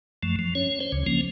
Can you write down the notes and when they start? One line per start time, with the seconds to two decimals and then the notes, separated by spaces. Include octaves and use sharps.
0.23 F#2 F3 A3
0.39 F3
0.55 C#4 C#5
0.80 C5 C#5
0.92 D2 C#3
1.06 F3 A#3 C#4